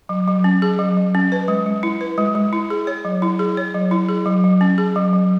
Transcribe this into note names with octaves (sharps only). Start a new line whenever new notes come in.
F#3
F#3
C#4
G#4
F#3
F#3
C#4
B4
G#3
G#3
E4
B4
G#3
G#3
E4
G#4
C#5
F#3
E4
G#4
C#5
F#3
E4
G#4
F#3
F#3
C#4
G#4
F#3
F#3